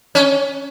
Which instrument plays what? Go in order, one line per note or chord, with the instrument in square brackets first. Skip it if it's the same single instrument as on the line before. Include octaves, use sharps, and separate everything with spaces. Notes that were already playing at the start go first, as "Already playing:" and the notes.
[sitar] C#4